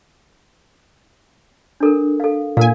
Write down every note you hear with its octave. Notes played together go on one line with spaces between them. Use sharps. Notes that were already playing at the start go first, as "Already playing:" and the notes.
D4 A4 A#4
A4 F5
A#2 A#4 F5 G#5